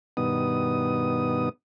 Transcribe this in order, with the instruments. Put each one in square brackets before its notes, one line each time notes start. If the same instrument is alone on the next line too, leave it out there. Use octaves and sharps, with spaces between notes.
[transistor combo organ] G2 B2 D#3 B3 D#6